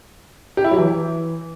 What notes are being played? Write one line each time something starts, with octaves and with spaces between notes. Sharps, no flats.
G4
E4
F#3
E3